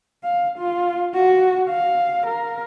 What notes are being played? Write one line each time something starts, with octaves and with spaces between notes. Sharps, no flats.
F5
F4
F#4
F5
A#4